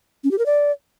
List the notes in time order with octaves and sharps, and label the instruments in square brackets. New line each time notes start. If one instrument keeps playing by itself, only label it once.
[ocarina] C#4
G4
A#4
D5